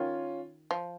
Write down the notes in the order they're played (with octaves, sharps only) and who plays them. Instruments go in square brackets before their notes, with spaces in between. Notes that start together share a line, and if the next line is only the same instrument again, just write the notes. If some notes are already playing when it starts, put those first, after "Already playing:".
Already playing: [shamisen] D#3 [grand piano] C#4 F4
[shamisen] F3